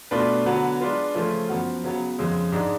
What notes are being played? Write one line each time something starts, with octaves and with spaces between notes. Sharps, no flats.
B2 A3 D4 F4 B4
D3 F#3 B3 F#4 B4
G#3 D4 F4 B4
C#3 F3 A3 C#4 F4
F#2 F3 B3 F#4
C#3 F#3 B3
F2 C#3 G#3
G#2 G#3 D4